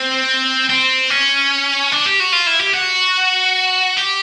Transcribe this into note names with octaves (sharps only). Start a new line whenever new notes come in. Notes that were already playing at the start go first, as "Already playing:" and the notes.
Already playing: C4
C4
C#4
D4
G4
F#4
F4
E4
G4
F#4
G4